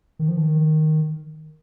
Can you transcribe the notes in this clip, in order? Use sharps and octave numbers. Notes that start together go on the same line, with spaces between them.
D#3
F3
D#3